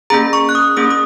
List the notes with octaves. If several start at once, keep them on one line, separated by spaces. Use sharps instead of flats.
A#3 C#4 G#4 A#5
C#6
F#6
D#6
A#3 C#4 G#4 D#6
D#6